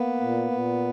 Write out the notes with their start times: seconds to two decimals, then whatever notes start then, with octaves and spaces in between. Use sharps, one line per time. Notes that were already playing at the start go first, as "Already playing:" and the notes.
Already playing: A#3 B3 B4
0.20 A#2
0.51 A#2